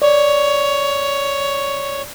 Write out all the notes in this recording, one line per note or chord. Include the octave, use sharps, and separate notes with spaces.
C#5 D5